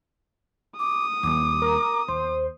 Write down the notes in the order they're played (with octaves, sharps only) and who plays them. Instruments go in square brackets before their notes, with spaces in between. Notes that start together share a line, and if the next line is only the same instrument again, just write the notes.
[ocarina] D6 [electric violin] D#6
[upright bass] D#2 G3 [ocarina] D6
[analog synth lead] A#4
[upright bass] D#2 [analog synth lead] C5